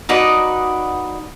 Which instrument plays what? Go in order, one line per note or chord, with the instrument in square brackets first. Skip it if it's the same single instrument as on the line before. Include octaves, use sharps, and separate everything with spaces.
[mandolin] D#4 F#4 B4 D5